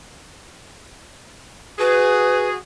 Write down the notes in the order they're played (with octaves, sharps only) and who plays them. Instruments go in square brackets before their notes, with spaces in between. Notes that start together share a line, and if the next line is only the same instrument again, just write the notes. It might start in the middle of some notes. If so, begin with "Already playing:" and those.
[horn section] F#4 G#4 [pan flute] B4